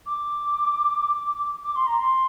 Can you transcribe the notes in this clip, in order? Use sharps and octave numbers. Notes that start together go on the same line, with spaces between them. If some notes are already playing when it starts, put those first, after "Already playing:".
D6
D6
C6
A#5
C6